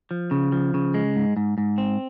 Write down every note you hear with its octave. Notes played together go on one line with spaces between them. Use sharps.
F3
C#3
F3
C#3
G#3
G#2
G#2
G#2
C4